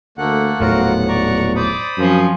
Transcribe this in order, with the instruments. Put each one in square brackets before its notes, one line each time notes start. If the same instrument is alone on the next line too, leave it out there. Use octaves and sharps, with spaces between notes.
[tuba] D2 [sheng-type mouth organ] A3 A#3 F#5
[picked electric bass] D#1 A2 [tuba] B1 [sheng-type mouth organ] F4 F#4 A#4 [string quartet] F#5
[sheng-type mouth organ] D5 A#5 C#6
[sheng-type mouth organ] C5 B5 D#6 [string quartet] D5
[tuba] F#2 [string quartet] F3 C4 C#4